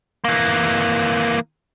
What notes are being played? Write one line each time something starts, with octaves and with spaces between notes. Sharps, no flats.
E3 A#3